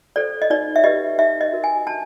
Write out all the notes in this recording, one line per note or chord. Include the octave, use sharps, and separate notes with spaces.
A4 C5 D5
D#5
D#4 D5
E5
G4 B4 D#5
D#4 E5
D#5
F#4 A#4
G#5
D4 A5